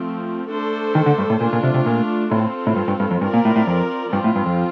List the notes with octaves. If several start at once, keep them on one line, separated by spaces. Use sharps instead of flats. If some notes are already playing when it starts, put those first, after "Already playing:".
Already playing: F3 A3 C4
A3 D4 A4 C5
D#3
D3
G2
A2
A#2 A3 D4 F4
A#2
C3
C3
A#2
A2 C4 F4 A4
A2
G2
G2
G2
F2
G2 C4 F4 A#4 D5
A#2
A2
A2
F2
G2 F3 C4 F4
A2
G2
F2